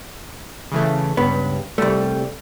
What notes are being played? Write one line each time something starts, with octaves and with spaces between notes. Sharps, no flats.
C#3 E3 A3
C#2 G2 B3
C2 G3 A3